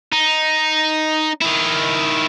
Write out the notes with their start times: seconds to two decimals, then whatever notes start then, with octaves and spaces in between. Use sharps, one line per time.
0.13 D#4
1.41 D#3 E4